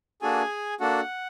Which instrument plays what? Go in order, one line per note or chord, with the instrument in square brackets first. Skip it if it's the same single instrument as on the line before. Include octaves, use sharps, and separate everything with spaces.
[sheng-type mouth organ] A#3 D4 F#4 G#4 A4 G#5
A#3 D4 F#4 A4 F#5